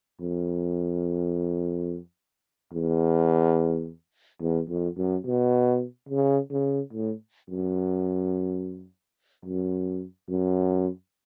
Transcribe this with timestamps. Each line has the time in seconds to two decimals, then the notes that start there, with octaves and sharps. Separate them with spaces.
0.21 F2
2.73 E2
4.41 E2
4.69 F2
4.97 F#2
5.25 B2
6.09 C#3
6.51 C#3
6.93 A2
7.50 F#2
9.45 F#2
10.29 F#2